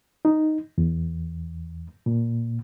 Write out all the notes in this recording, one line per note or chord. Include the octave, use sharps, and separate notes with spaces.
D#4
E2
A#2